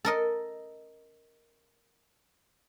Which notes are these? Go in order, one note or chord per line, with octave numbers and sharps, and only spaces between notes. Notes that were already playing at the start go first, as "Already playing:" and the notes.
A4 A#4 D#5